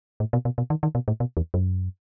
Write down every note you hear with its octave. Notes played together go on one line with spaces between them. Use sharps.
A2
B2
B2
B2
D#3
D#3
B2
A2
B2
E2
F#2